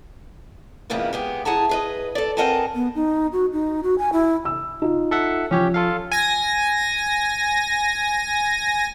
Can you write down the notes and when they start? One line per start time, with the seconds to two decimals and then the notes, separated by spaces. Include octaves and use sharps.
0.90 F2 G#2 C#3 A#3 B3 E4
1.13 G#3 B3 G4
1.45 E4 G#4 F#5 A5 A#5
1.69 G#4 B4 D#5
2.15 A4 D5
2.37 C4 A#4 D#5 F#5 G#5 A5
2.75 B3
2.95 D#4
3.33 F#4
3.52 D#4
3.83 F#4
3.98 G#5
4.13 E4
4.45 E6
4.82 D#4 F4
5.11 A4 E5 F#5
5.51 F3 C#4 G4 C#5
5.74 F4 A4 F5
6.11 G#5 A#6